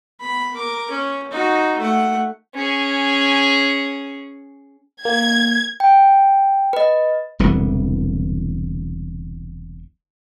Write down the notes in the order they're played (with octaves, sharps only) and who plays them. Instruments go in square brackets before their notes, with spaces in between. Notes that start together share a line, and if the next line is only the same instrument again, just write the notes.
[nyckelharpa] B3 B5
A#4 D6
C#4
D#4 F#4
A3 F#5
[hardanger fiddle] C#4 G#4
[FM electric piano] A#3 [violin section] G#6
[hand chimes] G5
B4 D#5
[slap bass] E1 C2 D3 E3